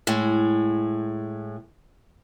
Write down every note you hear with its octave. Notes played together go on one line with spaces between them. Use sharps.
A2 G#3